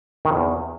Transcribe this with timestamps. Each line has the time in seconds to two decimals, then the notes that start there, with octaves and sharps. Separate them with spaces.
0.25 D#3
0.30 F2
0.36 E2